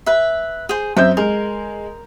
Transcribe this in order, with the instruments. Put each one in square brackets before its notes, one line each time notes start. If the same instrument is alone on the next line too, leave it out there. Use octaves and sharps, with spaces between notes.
[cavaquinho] B4 E5
G#4 C5
[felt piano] F#2 C4 G6 [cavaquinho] E5
[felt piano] G#3 [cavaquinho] A#4